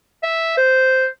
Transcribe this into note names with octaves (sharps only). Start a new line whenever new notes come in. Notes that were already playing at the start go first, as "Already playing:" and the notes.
E5
C5